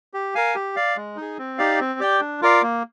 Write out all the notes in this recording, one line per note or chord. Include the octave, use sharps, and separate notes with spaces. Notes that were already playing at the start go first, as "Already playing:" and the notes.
G4
A#4 F5 G#5
G4
D5 F5
G#3
D#4
G#4
C4
D#4 G4 D5 F5
C4
G4 D5 G5
D4
F4 A#4 D5 F5
A#3